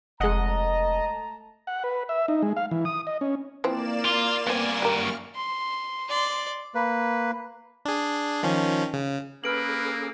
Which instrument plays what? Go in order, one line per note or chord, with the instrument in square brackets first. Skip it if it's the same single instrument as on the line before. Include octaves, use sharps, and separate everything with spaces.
[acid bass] F1 [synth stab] G#3 F#5 [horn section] A3 A5 A#5 [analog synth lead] D#5
[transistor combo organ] F#5
B4
E5
D#4
G#3
F5
E3
D#6
D#5
C#4
[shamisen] E3 F3 C4 [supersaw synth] A#3 D5 E7
[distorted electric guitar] F4
[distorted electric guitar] G2 G#5 [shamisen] B3 C4
[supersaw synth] F#2 C#6 F6 [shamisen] G4 A#4
[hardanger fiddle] C6
D5 C6
[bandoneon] A#3 B4
[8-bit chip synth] D4 G#4
D#3 F3 C#4
C#3
[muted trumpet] A#3 [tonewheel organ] C#4 G#4 A4 [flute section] B4 [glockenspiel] F6 D7 F#7